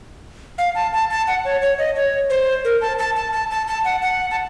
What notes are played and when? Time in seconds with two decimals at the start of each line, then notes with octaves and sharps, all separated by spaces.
0.58 F5
0.75 A5
0.93 A5
1.10 A5
1.28 F#5
1.45 C#5
1.62 C#5
1.79 D#5
1.96 C#5
2.30 C5
2.65 A#4
2.81 A5
2.98 A5
3.16 A5
3.33 A5
3.51 A5
3.67 A5
3.85 F#5
4.02 F#5
4.31 A5